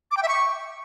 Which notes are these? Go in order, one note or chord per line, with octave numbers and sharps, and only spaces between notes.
D6
G5
E5
C#6